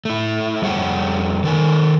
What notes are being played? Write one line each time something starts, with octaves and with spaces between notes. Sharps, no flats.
A3 E4
F2 G3 G#4 C#5 F#5 G5
D#3 A4 A#4 G#5